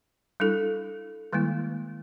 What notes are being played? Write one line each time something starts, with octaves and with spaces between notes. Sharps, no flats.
G3 D4 E4 A4
D#3 G3 G#3 A#3 E4